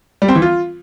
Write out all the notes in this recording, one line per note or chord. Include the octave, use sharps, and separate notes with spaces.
G3
C4
E3
F4